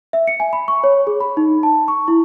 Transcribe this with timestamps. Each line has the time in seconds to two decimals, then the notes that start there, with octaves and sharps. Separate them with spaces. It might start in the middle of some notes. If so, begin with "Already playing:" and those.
0.13 E5
0.27 C#7
0.40 G#5
0.53 B5
0.68 C#6
0.84 C#5
1.07 G#4
1.21 B5
1.37 D#4
1.63 A5
1.88 C#6
2.08 E4